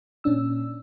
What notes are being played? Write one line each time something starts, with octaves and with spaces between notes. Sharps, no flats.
A#2 C#4 D4 E6